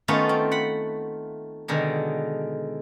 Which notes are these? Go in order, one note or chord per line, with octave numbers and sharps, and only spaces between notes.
D#3 A3 B3 C#4 F4
C4
F#5 B5
B2 D3 D#3 G#3